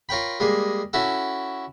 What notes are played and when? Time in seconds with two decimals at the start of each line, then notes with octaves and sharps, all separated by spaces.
0.09 F4 A#4 C#5 G5 B5
0.40 G3 G#3 A#3 G#4
0.93 C#4 E4 F#4 A4